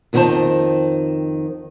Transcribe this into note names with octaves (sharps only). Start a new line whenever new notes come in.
F2 D#3 A#3 C4 C5 A5